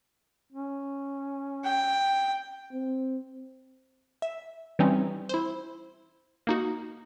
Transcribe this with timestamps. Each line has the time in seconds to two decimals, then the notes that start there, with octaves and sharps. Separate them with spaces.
0.53 C#4
1.64 G5
2.72 C4
4.22 E5
4.79 E3 G3 C4 C#4 D#4
5.29 E4 C5
6.47 A#3 D#4 F#4